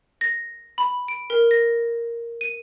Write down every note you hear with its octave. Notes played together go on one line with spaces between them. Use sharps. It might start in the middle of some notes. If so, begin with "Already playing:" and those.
A#6
B5
D7
A#4
A#6
D#7